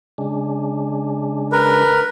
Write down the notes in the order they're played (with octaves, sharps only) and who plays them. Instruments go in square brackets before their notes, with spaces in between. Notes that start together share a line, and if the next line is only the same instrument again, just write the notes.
[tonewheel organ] C#3 G#3 D4
[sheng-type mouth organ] A#4 B4